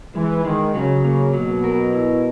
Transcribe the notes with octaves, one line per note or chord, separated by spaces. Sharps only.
E3 G#3
D#3 G#3
C#3 F#3
A#3
B2 F#3
A#4
E4